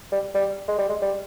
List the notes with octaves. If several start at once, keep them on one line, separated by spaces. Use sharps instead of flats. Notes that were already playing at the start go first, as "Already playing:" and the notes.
G3
G3
G#3
G3
G#3
G3